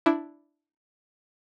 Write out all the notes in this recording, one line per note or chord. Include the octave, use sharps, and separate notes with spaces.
D4 E4